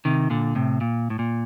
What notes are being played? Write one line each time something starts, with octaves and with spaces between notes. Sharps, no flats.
C3 D#3
A#2 D3
A2 C3
A#2
A2
A#2